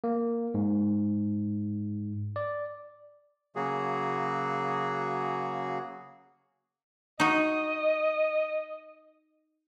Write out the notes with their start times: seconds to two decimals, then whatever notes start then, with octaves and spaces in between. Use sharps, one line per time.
0.04 A#3
0.54 G#2
2.36 D5
3.56 C#3 F#3 A#3 F#4 G#4
7.20 D#4 F#4 D#5